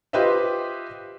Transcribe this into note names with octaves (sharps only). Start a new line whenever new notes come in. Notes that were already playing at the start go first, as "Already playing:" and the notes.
F4 G4 B4 C5 D#5 E5